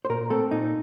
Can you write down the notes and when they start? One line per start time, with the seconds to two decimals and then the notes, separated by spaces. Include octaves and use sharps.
0.05 C5
0.09 A#2 A#4
0.30 A3 C4 A4
0.51 A#2 D#4